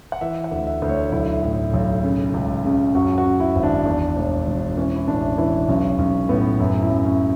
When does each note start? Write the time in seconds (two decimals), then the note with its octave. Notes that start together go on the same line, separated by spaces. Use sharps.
0.12 F#5
0.21 E3 E5
0.44 F#5
0.51 D2
0.67 E5
0.82 D2
0.90 C#5
1.12 B1 E4
1.43 A2
1.73 B1
2.04 C#3
2.34 C#2
2.65 C#3
2.95 F#2 F#4
3.18 F#4
3.26 C#3
3.40 E4
3.55 G#1
3.63 D4
3.86 E2
4.16 E1
4.47 E1
4.77 E3 C#4
4.96 E4
5.08 A1 D4
5.38 E3 E4
5.68 B1 C#4
5.98 B1 C#4
6.29 A2 B3
6.60 F#2 E4
6.82 E4
6.90 F#2
7.05 C#4